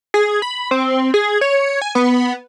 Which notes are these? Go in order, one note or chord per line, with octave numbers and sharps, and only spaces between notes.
G#4
B5
C4
G#4
C#5
G#5
B3